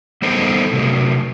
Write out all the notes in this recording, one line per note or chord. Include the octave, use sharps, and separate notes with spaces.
G3 B3 D#4 A4 C5
C3 F#3 A3